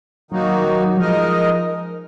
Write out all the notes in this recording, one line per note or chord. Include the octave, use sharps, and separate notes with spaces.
D#3 F#3 A#3 D#4 F#4
F#3
F3 G#3 D#4 A#4 D#5